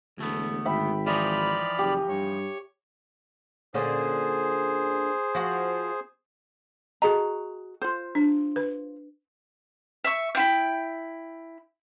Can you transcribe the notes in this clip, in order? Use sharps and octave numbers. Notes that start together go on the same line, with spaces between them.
E1 D2 A3 B3
G#1 E5 G5 B5
E3 F3 D#4 D5 E5 B5 F6
F#1 G4
G2 C#5
A#2 D3 C#4 G#4 C5
F3 F#4
F#4 G#4 D#5 A#5
F4 C5
D4
B4
E5 C#6
E4 F4 G5